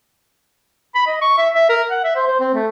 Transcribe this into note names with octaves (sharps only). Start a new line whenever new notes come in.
B5
D#5
C#6
E5
E5
A#4
F#5
E5
C5
C5
C4
A3